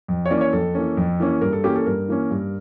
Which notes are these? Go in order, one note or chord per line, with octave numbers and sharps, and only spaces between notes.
F2
C#5
E3 A#3 C#4 D5
C#5
F2 A4
E3 A#3 C#4
F2
E3 A#3 C#4
G2 A#4
A4
E3 A#3 C#4 G4
A4
G2 A#4
E3 A#3 C#4
G2